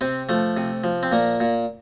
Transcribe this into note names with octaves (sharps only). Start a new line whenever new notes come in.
C3 C4
F3 A3
C3
F3
C4
A#2 A#3
A#2